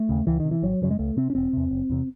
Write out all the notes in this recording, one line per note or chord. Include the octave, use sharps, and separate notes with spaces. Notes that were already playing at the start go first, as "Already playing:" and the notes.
Already playing: A3
D#2 C#3
C#2 E3
C3 D#3
E3
G#1 F#3
F#2 C#3 F#3
G#3
C#2 A3
C3 C4
C#4
E1 C4
E2 C3
F#1
E2 C3